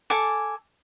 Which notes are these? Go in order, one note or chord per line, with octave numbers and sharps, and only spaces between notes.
A4 G#5 D6